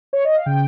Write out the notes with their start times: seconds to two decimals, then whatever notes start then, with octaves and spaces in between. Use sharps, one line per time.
0.13 C#5
0.25 D#5
0.35 F5
0.46 C#3 G5